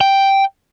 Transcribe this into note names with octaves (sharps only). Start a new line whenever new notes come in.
G5